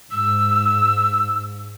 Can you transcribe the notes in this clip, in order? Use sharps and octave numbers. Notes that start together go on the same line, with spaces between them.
G#2 E6